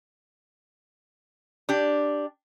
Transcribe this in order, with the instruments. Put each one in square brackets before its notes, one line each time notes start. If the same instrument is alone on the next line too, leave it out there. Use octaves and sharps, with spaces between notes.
[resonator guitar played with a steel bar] D4 G4